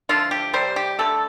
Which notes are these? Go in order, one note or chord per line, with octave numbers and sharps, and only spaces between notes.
D3 F3 A3 F4
G4
C3 G3 C5
G4
D3 A3 A4